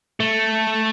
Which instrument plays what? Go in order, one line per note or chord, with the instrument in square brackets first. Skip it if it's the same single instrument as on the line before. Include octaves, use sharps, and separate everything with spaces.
[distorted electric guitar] A3